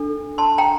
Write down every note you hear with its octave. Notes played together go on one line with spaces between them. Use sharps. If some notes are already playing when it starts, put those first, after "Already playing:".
Already playing: D4 A4
A5 C6
G5 A#5